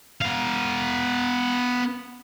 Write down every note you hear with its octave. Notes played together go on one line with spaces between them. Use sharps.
B3 F5